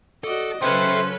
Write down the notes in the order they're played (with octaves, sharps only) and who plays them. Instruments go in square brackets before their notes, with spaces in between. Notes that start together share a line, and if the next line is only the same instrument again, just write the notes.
[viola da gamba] F#4 D5 D#5 [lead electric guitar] A4
[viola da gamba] C#3 F#3 [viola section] C#4 A4 B4 [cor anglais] C5 [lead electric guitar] E5 G5